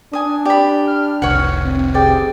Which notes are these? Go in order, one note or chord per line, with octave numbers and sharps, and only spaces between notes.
D4 G#5 D#6
G4 D5 B5
F6
F1 C2 C#5 F#5
C4
C3 G#4 D5 G5